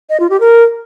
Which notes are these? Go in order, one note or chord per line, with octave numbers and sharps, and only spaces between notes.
D#5
F4
G4
A#4